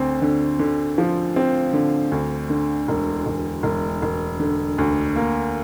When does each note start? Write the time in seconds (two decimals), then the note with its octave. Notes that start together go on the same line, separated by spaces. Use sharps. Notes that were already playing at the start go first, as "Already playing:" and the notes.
Already playing: D2 C4
0.22 D3
0.59 D3
0.98 F3
1.36 C4
1.73 D3
2.12 D2
2.50 D3
2.88 E1
3.26 E1
3.63 E1
4.02 E1
4.40 D3
4.78 D2
5.16 A#3